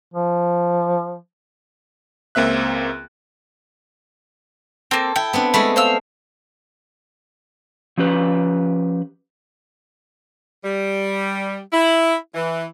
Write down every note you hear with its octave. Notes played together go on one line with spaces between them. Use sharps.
F3
C#2 A#3 C4 E5 F#6
A#3 C4 A4
E4 G5
B3 C4 D4
G#3 A3 E4 B5
C5 F5 E6
F3 C#4 G4 B4
G3
E4
E3